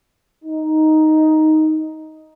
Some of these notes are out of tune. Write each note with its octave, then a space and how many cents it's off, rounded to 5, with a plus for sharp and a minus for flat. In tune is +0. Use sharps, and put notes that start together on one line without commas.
D#4 +5